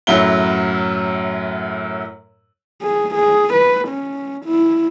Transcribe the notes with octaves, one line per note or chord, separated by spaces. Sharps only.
F#2 A2 F#3 E4 G7
G#4
G#4
B4
C#4
E4